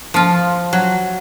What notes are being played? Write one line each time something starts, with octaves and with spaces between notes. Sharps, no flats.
F3 F4
F#3